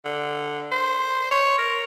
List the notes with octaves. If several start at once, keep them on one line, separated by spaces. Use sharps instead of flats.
D3
C5
C#5
A#4